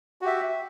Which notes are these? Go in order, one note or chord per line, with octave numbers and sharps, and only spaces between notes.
F#4 G4 E5